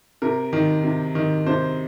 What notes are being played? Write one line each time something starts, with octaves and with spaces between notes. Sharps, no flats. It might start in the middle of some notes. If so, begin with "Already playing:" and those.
C3 A#4
D#3
C3
D#3
C3 C5